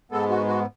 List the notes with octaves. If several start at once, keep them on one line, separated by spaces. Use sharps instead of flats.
G#2 G#3 B3 A4
F#4
F#4